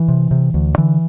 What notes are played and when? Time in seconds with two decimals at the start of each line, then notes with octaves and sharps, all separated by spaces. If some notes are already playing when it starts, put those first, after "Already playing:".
Already playing: E3
0.08 C3
0.31 C3
0.54 D2
0.78 D3 E3